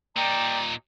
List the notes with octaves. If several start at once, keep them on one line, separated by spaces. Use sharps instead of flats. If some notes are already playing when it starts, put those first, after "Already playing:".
A#2 D#4 D5 G5 A#5